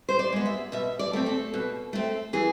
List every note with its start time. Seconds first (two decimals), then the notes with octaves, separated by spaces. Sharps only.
0.09 C5
0.19 D5
0.33 G#3 B3
0.46 E5
0.72 B2 E5
0.99 D5
1.13 A3 C4
1.26 A4
1.54 B2
1.93 A3 C4
2.33 E3 G#4